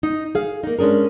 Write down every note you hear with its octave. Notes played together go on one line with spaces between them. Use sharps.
D#4
G#4 F5
A#3 D#4
G#3 C#4 D4 G#4 A#4